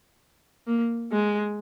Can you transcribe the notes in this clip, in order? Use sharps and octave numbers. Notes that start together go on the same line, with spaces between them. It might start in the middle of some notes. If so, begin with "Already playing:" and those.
A#3
G#3